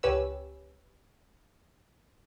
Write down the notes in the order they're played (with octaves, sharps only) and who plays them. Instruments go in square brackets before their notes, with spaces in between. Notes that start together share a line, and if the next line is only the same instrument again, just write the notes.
[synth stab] C#2 C#4 G4 B4 C#5 E6